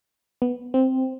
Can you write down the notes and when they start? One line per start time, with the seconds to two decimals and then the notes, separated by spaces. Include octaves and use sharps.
0.42 B3
0.74 C4